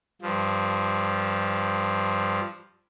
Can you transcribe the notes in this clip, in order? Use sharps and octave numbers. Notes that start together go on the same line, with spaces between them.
G2 F3